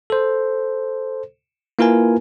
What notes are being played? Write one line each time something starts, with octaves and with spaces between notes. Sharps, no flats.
A4 C5
A#3 E4 F4 A#4 B4 G#5